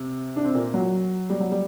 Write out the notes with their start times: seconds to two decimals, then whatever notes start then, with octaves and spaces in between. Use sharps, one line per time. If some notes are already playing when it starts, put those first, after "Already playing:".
Already playing: C3 C4
0.36 D4
0.45 C4
0.55 A#2 A#3
0.74 F#3
1.30 G3
1.40 F#3
1.52 G3